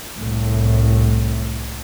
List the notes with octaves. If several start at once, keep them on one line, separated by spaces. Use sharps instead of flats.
C2 A2